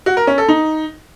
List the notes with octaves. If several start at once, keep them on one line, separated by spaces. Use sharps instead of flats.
F#4
A#4
C#4
A4
D#4